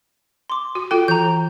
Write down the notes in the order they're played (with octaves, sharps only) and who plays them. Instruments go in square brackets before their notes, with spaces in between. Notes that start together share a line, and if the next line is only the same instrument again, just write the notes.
[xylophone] C6 D6
[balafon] F#4
[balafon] F4 A4 [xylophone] G5
[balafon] E3 [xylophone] A#5 G6